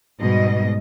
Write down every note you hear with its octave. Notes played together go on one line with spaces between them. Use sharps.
G#2 B2 G3 D#5